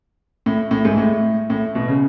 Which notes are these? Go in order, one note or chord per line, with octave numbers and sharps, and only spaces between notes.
A2
A2
G#2
A2
A2
B2
C#3